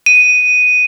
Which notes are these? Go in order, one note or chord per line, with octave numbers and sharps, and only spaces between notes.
D#7